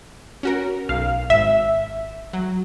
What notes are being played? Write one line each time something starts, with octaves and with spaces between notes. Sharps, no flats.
C#4 F#4 A#4
B1 F5
G#1 E5
F#3